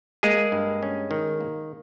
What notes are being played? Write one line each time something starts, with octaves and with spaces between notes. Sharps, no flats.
G#3 A#3 G#4
G2
C#4
D#3
A#3